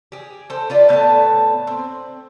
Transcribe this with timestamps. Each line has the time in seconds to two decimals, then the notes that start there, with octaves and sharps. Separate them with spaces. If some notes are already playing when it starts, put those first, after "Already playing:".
0.12 G4 G#4
0.50 A4 C5
0.70 F4 B4 D5
0.89 A2 B3 G5 A5
1.67 C4